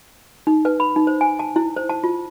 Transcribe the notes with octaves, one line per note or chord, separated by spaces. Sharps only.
D#4
B4
B5
D#4
C5
G#5
A5
E4
C5
A5
F4